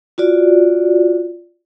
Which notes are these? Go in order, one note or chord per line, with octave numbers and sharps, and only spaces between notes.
F4 F#4 D5